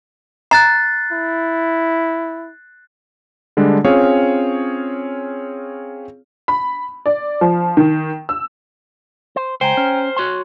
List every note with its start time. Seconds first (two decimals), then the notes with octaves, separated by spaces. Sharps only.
0.51 A#5 F#6 A6 C7
1.12 E4
3.57 D3 G3 G#3 D4
3.85 C4 C#4 F4 G#4 C#5 F5
6.48 B5
7.06 D5
7.41 F3
7.77 D#3
8.29 E6
9.36 C5
9.61 C#2 C5 G5 G#5 A#5
9.77 C#4 F6
10.16 F#4 C#5 C6